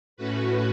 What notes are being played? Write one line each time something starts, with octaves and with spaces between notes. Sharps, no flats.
A2 A3 C#4 F#4 B4